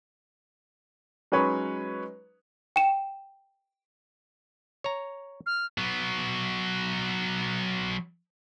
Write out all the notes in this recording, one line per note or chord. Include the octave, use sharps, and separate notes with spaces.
F#3 G#3 C#4 D#4 B4 C#5
G5 E7
C#5 A#5
F6
F#3 B3